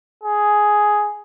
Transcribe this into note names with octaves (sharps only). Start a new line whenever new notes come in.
G#4